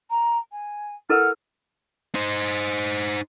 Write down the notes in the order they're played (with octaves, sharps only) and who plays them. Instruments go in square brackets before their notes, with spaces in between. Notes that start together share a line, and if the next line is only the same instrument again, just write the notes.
[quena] A#5
G#5
[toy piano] E4 A4 A#4 [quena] F#5 [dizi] F6
[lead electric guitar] D#4 C5